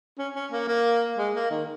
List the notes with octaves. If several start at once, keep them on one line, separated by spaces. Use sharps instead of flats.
C#4
C#4
A#3
A#3
G#3
A#3
D#3